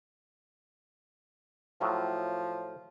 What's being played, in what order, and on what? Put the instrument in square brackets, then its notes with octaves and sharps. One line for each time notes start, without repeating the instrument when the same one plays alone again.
[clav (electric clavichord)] A2 F#3 F4 [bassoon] F3